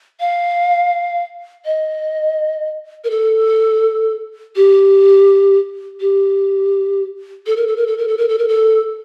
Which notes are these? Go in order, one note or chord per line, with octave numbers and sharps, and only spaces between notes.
F5
D#5
A#4
A4
G4
G4
A4
A#4
A4
A#4
A4
A#4
A4
A#4
A4
A#4
A4